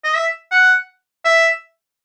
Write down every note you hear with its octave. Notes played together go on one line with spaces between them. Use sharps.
D#5
E5
F#5
E5